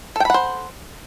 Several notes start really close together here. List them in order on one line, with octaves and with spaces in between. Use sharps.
A4 G5 B5 F#5 C5